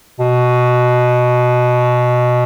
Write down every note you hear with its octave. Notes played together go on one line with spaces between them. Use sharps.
B2